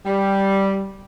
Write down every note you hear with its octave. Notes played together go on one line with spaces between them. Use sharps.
G3